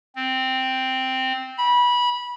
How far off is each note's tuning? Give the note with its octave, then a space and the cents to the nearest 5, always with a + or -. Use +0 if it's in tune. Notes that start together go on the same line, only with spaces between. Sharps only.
C4 -5
B5 -20